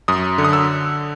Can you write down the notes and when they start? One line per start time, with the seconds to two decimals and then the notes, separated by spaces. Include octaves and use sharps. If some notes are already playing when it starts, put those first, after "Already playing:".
0.08 F#2 D#6
0.38 D3
0.45 D#6
0.53 E6